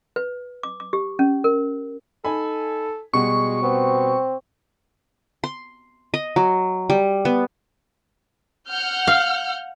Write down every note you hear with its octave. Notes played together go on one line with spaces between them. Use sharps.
B4
D6
D6
G4
C#4
A#4
D#4 A4 G#5 B5
B2 G3 G#3 F#4 C#6
B3 C4
C6
D#5
F#3
G3
B3
F#5 F6 G6
F5